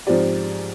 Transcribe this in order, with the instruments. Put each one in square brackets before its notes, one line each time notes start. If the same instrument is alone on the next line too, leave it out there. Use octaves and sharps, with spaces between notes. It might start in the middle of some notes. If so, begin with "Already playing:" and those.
[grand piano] G#2 F3 C4 G4 D5